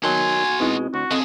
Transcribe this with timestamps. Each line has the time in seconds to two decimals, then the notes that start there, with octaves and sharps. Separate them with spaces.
0.03 D#3 F#3 B3 F#4 G#5 A5 C6
0.60 B2 G#3 C4 D#4 E4
0.94 D2 F#4
1.11 D3 C4 G#4 A4 D#5 F5 C6